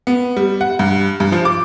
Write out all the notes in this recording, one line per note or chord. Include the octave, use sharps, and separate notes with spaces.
B3
G3
F#5
G2
G2
F3
D6